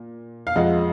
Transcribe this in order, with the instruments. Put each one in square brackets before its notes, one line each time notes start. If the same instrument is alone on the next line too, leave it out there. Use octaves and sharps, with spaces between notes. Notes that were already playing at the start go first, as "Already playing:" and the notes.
Already playing: [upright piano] A#2
F5
F2 F3 G#3 D#5 F#5